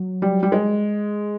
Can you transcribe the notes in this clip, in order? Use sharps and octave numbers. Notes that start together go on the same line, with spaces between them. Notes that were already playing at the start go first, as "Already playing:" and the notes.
Already playing: F#3
G3
G3
G#3